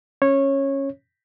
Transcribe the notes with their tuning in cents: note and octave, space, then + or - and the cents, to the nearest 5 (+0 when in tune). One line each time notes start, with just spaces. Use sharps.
C#4 -10 C#5 -15